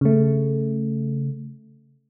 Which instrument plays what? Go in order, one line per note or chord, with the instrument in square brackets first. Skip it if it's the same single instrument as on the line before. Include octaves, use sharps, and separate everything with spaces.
[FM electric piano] C#3 A3